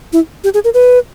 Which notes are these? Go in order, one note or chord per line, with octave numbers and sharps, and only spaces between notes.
E4
G4
G#4
A#4
B4